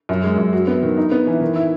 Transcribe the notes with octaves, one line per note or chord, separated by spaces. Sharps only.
F#2
G#3
F#2
F#4
B3
D#3
D#4
B3
E3
D#3
E4